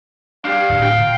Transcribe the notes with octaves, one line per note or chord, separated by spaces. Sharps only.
D4 G4 F5
D1
G5
A#2